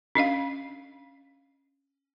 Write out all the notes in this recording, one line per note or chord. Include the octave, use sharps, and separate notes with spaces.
C#4 D4 D#5 F5